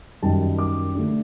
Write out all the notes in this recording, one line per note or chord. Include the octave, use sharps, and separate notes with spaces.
F#2 D#3 G3 A5
D6
D3 A3 D4